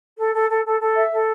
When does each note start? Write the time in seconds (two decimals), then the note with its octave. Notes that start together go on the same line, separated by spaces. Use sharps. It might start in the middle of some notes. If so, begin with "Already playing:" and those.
0.18 A4
0.34 A4
0.49 A4
0.64 A4
0.80 A4
0.96 E5
1.12 A4